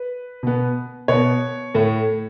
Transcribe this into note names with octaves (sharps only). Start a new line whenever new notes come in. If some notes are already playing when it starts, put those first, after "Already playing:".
Already playing: B4
B2 B3
B2 B3 C#5
A2 A3